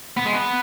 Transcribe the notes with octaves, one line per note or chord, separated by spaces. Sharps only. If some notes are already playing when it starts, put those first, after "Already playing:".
B3
G#3
B3